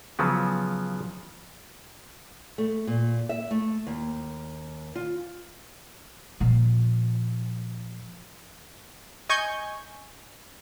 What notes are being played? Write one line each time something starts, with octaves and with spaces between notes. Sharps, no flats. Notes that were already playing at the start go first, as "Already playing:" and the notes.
C#3 F3 F#3 B3
A3
A#2
E5
A3
D#2
F4
A#2 F3
D#5 G#5 C#6 G6 G#6